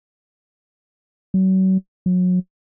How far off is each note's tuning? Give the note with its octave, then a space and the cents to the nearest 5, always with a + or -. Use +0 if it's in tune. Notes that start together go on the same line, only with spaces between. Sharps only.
F#3 +35
F#3 -30